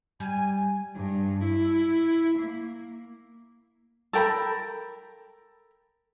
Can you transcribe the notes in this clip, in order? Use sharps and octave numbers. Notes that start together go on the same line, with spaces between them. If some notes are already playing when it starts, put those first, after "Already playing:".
G3 G#5
G2
E4
A#3
A4 A#4 G5 B5